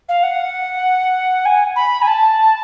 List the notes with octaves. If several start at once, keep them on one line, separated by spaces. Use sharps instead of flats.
F5
F#5
G#5
B5
G#5
A5